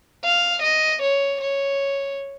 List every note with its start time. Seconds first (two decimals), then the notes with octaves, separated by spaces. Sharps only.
0.24 F5
0.63 D#5
1.02 C#5
1.41 C#5